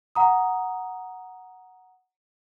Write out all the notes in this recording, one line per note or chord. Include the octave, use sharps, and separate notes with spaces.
F#5 A#5 D#6